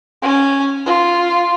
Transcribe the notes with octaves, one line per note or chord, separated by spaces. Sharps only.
C#4
F4